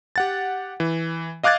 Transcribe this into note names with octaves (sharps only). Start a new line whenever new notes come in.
G4 F#5 A6
E3
D#5 F5 D6 F#6 G#6 A6